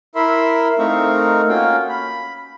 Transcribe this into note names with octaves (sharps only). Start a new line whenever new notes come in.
E4 A#4 E5 B5 C6
A3 C4 D#4 A#4 F5 C#6
A#3 C#4 F4 F#4 F5 G5
B5